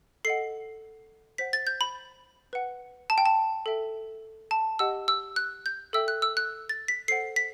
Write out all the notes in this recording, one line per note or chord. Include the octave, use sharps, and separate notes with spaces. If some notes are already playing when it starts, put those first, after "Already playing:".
A4 D#5 F#5 C7
C5 F#5 B6
A6
G6
B5
B4 F#5
A5
G5
A5
A4 E5 G5
A5
G4 D#5 F#5 E6
E6
F#6
G6
A4 E5 G5 E6
F#6
E6
F#6
A6
B6
A4 C5 F#5 C7
B6